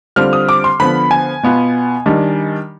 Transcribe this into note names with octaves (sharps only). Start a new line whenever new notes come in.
D3 G3 C4 F4 F6
D#6
D6
C6
D3 F3 B3 B5
G#5
B2 B3 F4
D#3 G3 D4